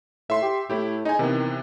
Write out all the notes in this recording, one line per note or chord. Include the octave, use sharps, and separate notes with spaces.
A2 E5 C6
G4
A2 A3 E4 G4
G#3 D#4 G#5
C3 D#3 E3 B3